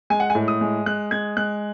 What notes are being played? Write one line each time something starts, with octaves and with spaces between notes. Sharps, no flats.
G#3 G#5
F#5
G#5
A2
D#6
G#3
G#3 F#6
G#3 G#6
G#3 F#6